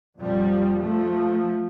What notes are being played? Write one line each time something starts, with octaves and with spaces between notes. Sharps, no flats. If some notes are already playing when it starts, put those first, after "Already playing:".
F2 A#2 F3 G3
F3 A3